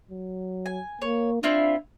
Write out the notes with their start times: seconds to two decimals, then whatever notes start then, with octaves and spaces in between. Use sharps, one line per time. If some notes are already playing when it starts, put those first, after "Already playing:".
0.11 F#3
0.66 G#5
1.02 A#3 C#5
1.43 C4 D4 E4 F4